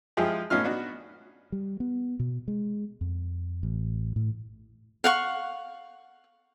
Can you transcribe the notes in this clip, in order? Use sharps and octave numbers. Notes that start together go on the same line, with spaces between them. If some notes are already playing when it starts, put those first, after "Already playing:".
F3 G#3 E4 F4 G4 G#4
A2 B3 C#4 D#4 F4 F6
B3 D4 D#4 F#4
G3
B3
B2
G#3
F2
A1
A2
F5 F#5 C#6